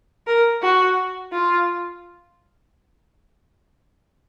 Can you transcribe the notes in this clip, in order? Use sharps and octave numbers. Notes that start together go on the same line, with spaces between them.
A#4
F#4
F4